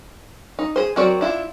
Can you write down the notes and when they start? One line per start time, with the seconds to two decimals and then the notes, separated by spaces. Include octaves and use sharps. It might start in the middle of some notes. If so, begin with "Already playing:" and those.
0.59 D#4
0.76 G#4 C5
0.96 F#3 C4 F#4 A#4 D5
1.21 D4 E4 F4